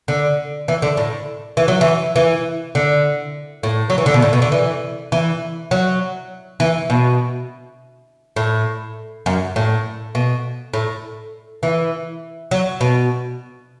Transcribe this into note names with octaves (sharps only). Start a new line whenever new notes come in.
D3
E3
D3
A2
E3
F#3
E3
E3
D3
A2
F#3
E3
D3
B2
A2
B2
D3
E3
E3
F#3
E3
B2
A2
F#2
A2
B2
A2
E3
F#3
B2